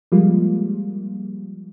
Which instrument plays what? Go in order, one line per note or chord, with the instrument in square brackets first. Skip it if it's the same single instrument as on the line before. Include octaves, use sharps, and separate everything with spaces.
[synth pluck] F3 G3 G#3 A#3 F4